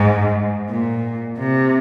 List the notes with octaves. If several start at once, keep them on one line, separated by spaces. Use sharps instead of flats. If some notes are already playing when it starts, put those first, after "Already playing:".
Already playing: G#2
A#2
C3